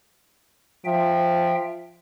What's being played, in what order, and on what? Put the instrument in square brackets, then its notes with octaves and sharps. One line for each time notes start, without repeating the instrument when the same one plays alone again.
[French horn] F3 [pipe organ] E5 G5